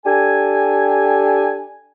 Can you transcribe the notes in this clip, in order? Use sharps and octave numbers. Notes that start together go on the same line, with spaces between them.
D4 G4 A4 G#5